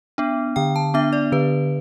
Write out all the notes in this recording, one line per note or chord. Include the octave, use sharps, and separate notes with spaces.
B3 D4
D3 G5
A5
B3 D4 E5
D5
D3 B4